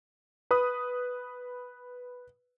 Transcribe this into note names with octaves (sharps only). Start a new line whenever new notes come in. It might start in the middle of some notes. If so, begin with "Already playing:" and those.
B4 B5 D#6